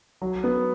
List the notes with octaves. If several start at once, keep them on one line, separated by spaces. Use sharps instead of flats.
F#3
B3